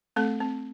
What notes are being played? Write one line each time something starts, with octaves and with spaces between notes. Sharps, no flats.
A3 C4 A4
C4